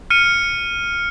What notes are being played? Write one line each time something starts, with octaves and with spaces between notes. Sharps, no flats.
F6 C#7 D#7